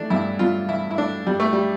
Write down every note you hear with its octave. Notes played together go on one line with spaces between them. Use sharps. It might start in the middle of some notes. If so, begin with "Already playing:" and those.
Already playing: E3 A3 D4
G2 E4
G2 F4
E3 E4
E4
A3 D4
G2 G3
A3
G3